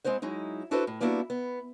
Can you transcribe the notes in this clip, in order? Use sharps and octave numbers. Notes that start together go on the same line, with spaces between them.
G#3 C4 E4 C5 F#5
F#3 G#3 D#4 E4
D4 E4 F#4 A4 B4 C5
A2
G3 A#3 B3 D4 E4 F#4
B3